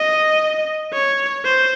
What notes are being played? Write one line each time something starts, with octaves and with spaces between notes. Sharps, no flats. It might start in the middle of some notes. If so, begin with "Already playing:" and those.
Already playing: D#5
C#5
C5